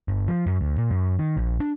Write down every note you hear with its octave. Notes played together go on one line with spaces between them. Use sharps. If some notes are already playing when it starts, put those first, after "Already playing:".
G1
F3
F#2
D2
A#2
F#2
D#3
A#1
D4